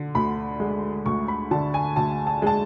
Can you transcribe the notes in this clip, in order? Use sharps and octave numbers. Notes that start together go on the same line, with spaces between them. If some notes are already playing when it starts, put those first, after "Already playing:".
Already playing: D3
D2 B5
G#3
D2 C#6
B5
D3 A5
G#5
D2 A5
A5
G#3 A5